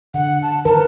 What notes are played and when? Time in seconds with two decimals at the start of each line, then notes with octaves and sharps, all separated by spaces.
0.14 D3 F#5
0.42 A5
0.65 D#3 A#4 B4 A5